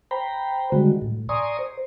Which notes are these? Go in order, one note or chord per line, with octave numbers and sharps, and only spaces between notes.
C5 G5 A#5 B5
D3 D#3 G3 G#3 F#4
A2
D5 G#5 A#5 C6 C#6 D#6
C5